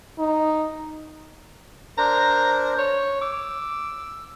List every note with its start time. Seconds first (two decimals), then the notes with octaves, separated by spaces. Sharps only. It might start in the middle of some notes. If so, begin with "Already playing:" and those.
0.19 D#4
1.98 D4 A#4 C5 A#5
2.79 C#5
3.21 D6 E6